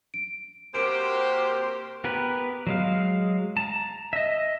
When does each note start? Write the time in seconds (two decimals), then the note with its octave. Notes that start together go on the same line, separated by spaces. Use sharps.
0.14 D7
0.75 C3 A#3 F#4 G4 A#4 C5 D7
2.04 B3 G4 A#4 B4
2.67 F#3 G#3 F5
3.57 A5 A#5
4.13 D#5 E5